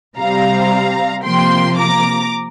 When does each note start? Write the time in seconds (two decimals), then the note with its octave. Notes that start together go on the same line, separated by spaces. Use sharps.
0.18 C3 G3 C4 F5 A#5
1.24 C3 F3 A#3 G5 C6
1.77 A#5 D6